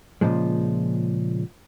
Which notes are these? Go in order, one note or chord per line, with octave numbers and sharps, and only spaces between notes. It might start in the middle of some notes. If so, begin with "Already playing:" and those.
A#2 C#3 F3 G#3